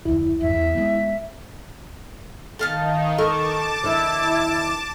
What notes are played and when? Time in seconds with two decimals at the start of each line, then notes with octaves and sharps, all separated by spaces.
0.05 F1 D2 E4
0.40 G1 E2 E5
0.54 E2
0.75 G#3 B3
2.59 D#3 D#4 A4 F5 A5
3.18 A4 A#4 A5 C#6 D6
3.83 E2 D#3 D4 E4